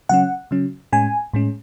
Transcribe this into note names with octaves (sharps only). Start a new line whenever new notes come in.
C#3 F#3 C#4 F#5
C#3 F#3 C#4
A2 G#3 C#4 G#5
A2 G#3 C#4